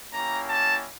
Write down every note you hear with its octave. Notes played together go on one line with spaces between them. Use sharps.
A#3 C#4 E4 G4 A#5
A5